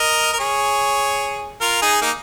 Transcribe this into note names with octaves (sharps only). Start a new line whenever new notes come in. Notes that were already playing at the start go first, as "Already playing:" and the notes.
Already playing: A#4 D#5
A#4
G#4 C#5
F4 A#4
D#4 G#4
A#3 D#4